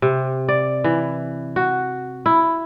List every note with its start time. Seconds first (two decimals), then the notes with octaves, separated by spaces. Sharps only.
0.02 C3
0.48 D5
0.84 E3
1.56 F#4
2.26 E4